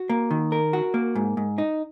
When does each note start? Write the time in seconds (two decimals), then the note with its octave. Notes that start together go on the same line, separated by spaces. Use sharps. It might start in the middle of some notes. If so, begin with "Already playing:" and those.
Already playing: F#4
0.10 A#3
0.31 D#3
0.52 A#4
0.73 F#4
0.94 A#3
1.15 G#2
1.37 G#2
1.58 D#4